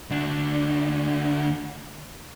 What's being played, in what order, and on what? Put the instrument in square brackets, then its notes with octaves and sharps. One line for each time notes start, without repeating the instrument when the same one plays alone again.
[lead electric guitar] D2 D4